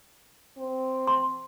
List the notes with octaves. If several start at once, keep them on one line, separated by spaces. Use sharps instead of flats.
C4
C6